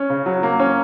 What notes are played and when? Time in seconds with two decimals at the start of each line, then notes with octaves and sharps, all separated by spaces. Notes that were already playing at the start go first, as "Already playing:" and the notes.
Already playing: C#4
0.10 C#3
0.26 F#3
0.43 A#3
0.60 C#4